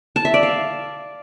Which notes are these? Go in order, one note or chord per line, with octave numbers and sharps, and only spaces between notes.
A5
E5
D5
F5